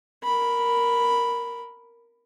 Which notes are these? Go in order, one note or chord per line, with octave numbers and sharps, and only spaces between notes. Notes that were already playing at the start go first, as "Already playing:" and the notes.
A#4 B5